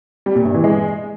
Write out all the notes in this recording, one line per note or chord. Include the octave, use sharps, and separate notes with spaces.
G3
A#2
G2
E3
G#3